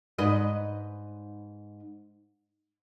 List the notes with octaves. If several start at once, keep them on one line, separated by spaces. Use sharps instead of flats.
G#2 B4 D#5